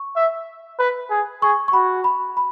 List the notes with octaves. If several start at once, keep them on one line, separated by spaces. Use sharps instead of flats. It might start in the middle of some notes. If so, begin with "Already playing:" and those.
Already playing: C#6
E5
B4
G#4
G#4 C#6
C#6
F#4 B5
B5
B5